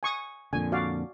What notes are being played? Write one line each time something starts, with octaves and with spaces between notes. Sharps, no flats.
G#5 C#6 D#6
F2 A#2 D3 G#5
F#4 D5 F5